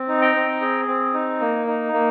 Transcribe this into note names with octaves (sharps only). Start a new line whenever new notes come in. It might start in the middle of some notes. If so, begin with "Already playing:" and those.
Already playing: C4
D#4
G5 A#5
C4
G#4
C4
D#4
A#3
D#4
A#3